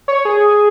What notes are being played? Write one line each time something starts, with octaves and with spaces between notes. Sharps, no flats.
C#5
G#4